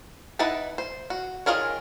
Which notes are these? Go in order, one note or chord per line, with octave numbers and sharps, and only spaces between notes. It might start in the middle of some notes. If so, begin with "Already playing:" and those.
D#4 E4 B4 F#5 A5
C5
F#4
D#3 F4 G#4 A#4 C#5